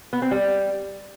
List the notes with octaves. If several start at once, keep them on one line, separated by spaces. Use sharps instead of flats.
B3
C4
G3